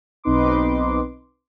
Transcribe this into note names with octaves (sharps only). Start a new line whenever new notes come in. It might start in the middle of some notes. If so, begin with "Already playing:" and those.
B1 C4 D#4 B4 C6 D6